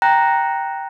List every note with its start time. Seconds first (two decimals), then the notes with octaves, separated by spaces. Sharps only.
0.02 G5 A#5 F#6 A#6